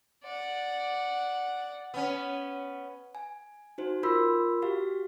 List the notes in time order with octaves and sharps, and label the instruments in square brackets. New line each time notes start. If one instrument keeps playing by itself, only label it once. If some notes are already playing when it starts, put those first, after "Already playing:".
[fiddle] D5 F#5
[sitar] B3 C#4
[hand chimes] G#5
D#4 F#4 C5
F4 A#4 B5 C6 E6 B6
F#4 G4 F5